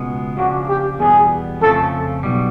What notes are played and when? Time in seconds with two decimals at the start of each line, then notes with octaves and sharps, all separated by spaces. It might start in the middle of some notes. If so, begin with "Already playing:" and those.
Already playing: C#2 B2 G#3 B3
0.37 C#3 F3 A#3 D4 F#4
0.69 G4
0.99 E2 B2 G3 B3 G#4
1.61 F2 C#3 F3 A3 A4
2.23 B1 B2 G3